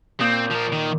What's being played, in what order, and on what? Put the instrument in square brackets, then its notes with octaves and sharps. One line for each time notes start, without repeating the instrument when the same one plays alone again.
[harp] A#2 D#6 G6 [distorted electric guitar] C4
[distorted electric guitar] F3 A#4
D#3